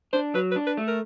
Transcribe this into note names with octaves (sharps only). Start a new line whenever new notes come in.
D4 C5
F#3 B4
B4
D4
B4
A3
A#4